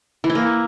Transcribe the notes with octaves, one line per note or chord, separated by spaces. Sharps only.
E3
E4
A#3